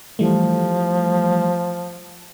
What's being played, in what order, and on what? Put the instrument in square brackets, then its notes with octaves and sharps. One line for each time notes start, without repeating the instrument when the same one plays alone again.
[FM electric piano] E3 G3 A3 [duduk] F3